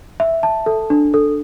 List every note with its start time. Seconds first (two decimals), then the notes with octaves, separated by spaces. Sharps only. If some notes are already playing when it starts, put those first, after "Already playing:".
0.20 E5
0.43 A5
0.66 A4
0.90 D4
1.14 A4